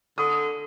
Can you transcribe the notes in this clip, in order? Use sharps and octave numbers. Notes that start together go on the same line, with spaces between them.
D3 D#6